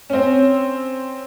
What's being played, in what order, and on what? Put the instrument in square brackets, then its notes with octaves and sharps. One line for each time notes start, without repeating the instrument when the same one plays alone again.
[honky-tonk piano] C4 C#4